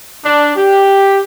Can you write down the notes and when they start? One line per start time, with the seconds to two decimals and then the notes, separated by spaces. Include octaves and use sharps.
0.24 D4
0.56 G4